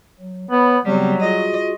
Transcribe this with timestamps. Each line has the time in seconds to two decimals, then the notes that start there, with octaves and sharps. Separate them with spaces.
0.19 F#3
0.51 B3 C#5 B5
0.85 C#3 F#3 G3 B3 C4
1.20 F4 F#4 G#4 D#5